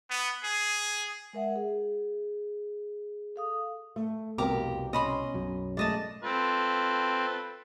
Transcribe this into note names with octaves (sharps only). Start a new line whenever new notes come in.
B3
G#4
G#3 A#4 E5 F#5
G#4
A4 F5 D#6
A3
C2 F2 B2 G4 A#4 A#5 D6
C#4 D#5 B5 C6
B1 F#2
G#3 A3 D5 D#5 A5
C4 F4 A4 B4